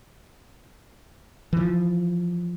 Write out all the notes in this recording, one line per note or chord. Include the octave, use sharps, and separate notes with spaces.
E3 F3